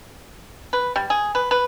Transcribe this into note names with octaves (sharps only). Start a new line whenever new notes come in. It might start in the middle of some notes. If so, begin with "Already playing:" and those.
B4
G3
G#4
B4
B4